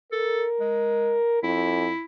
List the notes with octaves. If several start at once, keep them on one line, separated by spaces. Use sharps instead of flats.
A4 A#4
G#3
F2 E4